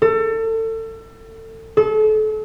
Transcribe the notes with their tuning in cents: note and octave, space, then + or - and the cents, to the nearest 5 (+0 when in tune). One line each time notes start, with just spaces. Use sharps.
A4 +30
A4 -35